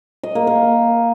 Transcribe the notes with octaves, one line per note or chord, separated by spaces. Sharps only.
D#5
A#3
A#3